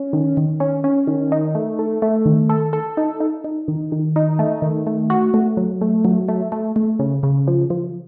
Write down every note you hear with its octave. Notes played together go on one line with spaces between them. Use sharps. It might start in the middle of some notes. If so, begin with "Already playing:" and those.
Already playing: C#4
D#3
D#3
C#4
C#4
D#3
D#4
A3
A4
A3
D#3
A4
A4
D#4
D#4
D#4
D#3
D#3
D#4
A3
D#3
A3
F#4
A3
F#3
A3
F#3
A3
A3
A3
C#3
C#3
F3
F3